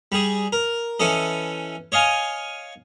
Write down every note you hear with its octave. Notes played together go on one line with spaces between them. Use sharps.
G3 G#4
A#4
E3 C#4 A4 D#5
C#5 D#5 F5 G#5